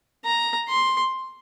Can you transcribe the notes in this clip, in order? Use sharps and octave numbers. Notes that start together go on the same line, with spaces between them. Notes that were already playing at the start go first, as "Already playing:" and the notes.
A#5
C6